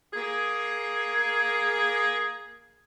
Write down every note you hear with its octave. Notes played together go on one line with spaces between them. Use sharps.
A#3 G#4